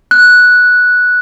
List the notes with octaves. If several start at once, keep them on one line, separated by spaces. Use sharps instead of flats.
F#6